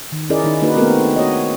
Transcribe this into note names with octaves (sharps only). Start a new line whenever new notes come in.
D#3
C#4 E4 G#4 A#4 D5 D#5
D#3 D#4
A#3 D4 D#4 F#4 B4
A3 B3 C4 F#4 A4 A#4
F#4 C#5 D#5